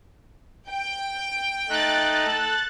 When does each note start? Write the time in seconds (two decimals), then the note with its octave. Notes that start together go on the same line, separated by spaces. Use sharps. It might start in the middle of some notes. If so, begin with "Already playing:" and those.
0.69 G5
1.69 A3 D#4 F#6 A6
2.26 A4